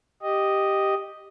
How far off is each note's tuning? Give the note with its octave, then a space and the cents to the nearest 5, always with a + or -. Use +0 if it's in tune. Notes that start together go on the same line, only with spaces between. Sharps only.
G4 +0 D#5 +0